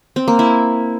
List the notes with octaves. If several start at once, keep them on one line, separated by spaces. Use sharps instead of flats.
C4
A#3
E4